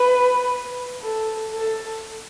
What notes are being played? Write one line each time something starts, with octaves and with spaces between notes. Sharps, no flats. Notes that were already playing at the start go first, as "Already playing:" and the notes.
Already playing: B4
A4
A4